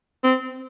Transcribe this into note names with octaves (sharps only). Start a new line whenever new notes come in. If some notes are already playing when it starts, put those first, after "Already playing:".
C4